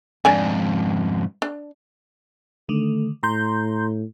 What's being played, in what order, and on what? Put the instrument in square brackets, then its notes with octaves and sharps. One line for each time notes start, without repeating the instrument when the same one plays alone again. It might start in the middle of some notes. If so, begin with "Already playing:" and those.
[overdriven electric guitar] F2 G#2 [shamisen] D4 D5 G#5
[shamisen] D4
[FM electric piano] D3 D#3 [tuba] A3
[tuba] A2 [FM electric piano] A#5 C6 G6